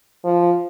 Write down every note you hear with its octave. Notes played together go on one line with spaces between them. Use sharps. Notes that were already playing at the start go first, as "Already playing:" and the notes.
F3